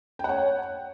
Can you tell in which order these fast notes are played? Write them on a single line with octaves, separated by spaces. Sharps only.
G5 F#5 C#5